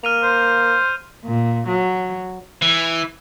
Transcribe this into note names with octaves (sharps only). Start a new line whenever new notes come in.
A#3 F6 D#7 F7
C5
A#2
F#3
E3